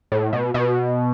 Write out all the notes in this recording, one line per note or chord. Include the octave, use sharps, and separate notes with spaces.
A2
B2
B2